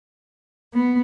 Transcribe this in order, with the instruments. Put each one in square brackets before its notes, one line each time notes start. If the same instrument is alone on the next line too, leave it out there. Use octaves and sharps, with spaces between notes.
[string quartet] B3